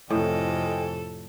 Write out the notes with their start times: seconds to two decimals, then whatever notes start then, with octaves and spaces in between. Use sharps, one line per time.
0.10 F2 A2 C3 A4 D#5 G5 G#5